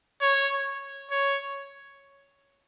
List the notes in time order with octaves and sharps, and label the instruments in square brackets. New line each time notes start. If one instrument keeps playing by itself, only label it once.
[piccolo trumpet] C#5
C#5